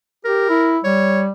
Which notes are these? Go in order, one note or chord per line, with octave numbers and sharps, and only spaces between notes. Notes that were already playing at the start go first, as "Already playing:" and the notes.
G4 A#4
E4
G3 C#5